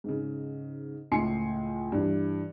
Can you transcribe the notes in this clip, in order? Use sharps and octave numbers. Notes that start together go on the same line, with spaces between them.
G#2 C#3
C#2 A2 G#5 C6 C7 C#7
G2 E3